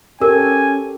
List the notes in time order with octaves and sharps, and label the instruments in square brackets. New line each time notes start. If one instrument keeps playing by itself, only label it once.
[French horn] C#4 [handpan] G4 A4 [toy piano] A#4 [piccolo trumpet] G#5